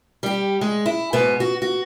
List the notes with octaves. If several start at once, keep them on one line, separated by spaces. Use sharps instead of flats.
G3 G4
G#3
E4
G#2 B2 B3
F#4
F#4